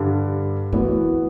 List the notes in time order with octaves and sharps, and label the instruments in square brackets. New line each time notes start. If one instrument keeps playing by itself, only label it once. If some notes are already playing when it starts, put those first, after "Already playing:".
Already playing: [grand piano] G2 D3 G3
[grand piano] E3 B3 F#4 [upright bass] A3